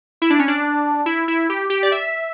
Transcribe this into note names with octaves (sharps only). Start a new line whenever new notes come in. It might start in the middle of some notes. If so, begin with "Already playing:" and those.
E4
D4
C#4
D4
E4
E4
G4
G4
D5
E5